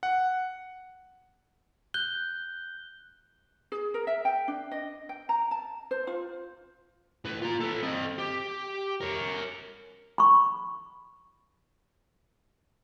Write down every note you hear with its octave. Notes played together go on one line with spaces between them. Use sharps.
F#5
F#6 G6 G7
G#4
A#4
E5
G5
D4
D#5
G5
A#5
A5
C5
F4
A2 B4
F4 A#5
A4 B4
C4 D#5
G4
A#4 C#5
B5 C#6